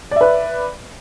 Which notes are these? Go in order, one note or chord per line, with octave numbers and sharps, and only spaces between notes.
B4 D5 E5